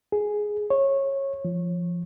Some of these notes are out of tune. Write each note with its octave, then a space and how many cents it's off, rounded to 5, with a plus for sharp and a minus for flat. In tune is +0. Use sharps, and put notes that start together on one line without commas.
G#4 +5
C#5 -20
F3 -10